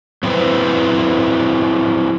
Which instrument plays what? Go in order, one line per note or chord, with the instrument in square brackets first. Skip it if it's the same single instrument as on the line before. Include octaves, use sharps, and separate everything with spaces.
[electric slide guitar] F#3 C4 E4 G#4 B4 C5